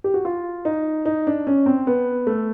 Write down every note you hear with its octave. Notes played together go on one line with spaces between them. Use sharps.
G4
F#4
F4
D#4
D#4
D4
C#4
C4
B3
A3